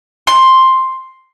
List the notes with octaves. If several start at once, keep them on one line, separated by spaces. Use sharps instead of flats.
C6